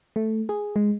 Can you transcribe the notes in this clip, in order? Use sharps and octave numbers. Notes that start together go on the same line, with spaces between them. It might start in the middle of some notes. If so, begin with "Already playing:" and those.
A3
G#4
G#3